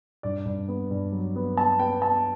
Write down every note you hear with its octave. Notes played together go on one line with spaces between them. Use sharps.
G2 D5
G2
B3
G2
F#3
B3
B3 A5
B3 G5
B3 A5